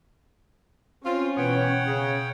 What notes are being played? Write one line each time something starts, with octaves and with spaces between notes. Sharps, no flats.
C4 C#4 F4
B2 E3 B3 C#5 F#5 G5
C#3